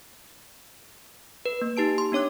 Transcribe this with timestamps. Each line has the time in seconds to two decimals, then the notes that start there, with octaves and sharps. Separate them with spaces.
1.45 B4
1.62 A#3
1.77 D#4 G4 A5 D7
1.98 C6
2.12 B3 D4 C#5 D6 F#6